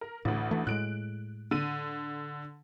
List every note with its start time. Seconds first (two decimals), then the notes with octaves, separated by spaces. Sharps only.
0.01 A#4
0.25 A1 D2 A2
0.51 E3 A3
0.67 A2 G#3 F#6 D7
1.51 D3 D#7